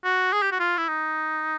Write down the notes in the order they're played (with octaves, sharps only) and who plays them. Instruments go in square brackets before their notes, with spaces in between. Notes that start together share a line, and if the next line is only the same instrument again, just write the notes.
[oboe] F#4
G#4
G4
F#4
F4
E4
D#4